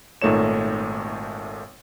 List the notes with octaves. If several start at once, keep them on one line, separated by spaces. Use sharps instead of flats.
G#1 A#2 A3 D#4 C#5 E7